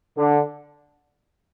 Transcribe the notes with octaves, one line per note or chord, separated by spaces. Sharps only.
D3